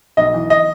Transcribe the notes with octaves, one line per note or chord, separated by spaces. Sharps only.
B1 D#5
E3
D#5